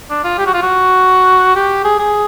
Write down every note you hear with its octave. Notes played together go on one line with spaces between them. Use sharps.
D4
F4
G4
F#4
F4
F#4
G4
G#4
G#4